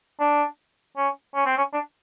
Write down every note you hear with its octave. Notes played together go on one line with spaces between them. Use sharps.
D4
C#4
C#4
C4
C#4
D4